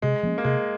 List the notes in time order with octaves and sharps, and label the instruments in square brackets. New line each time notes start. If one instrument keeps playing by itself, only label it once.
[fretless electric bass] C3 [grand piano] G#3
[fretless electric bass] F3 A#3 C#4
[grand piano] A#3
[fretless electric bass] C3 [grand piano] G#3